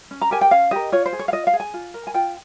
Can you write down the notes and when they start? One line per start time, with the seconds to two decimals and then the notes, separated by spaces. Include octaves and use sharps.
0.11 C#4
0.21 A#5
0.31 G4 A#4 G#5
0.41 G5
0.51 C#4 F5
0.71 G4 A#4 D#5
0.92 F4 C#5
1.06 C5
1.13 G#4
1.19 C#5
1.28 F5
1.32 F4 D#5
1.47 F5
1.53 G#4
1.60 G#5
1.74 F4
1.94 A#4
2.07 G#5
2.14 F4 G5